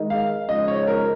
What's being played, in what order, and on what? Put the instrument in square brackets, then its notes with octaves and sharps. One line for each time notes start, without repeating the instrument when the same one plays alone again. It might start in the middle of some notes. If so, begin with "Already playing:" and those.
Already playing: [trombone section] D#3 G#3 D#4
[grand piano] F5
[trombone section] C#3 F3 G#3 D#4 [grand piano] D#5
[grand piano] C#5
A#4